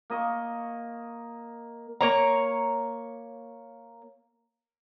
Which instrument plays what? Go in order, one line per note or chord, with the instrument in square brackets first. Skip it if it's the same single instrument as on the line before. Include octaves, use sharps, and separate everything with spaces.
[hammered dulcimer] A#3 D#5 C#6
[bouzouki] A#3 C#5 A#5